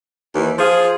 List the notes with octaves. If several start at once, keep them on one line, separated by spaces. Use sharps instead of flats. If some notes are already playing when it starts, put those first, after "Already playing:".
D#2 E3
F3 F4 G#4